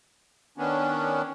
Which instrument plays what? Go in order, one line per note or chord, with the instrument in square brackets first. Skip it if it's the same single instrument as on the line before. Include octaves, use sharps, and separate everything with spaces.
[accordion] D#3 B3 C#4 D4